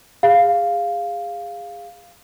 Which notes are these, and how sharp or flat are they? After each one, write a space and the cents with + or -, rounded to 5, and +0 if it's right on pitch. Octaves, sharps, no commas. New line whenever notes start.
G#4 -25 F5 +0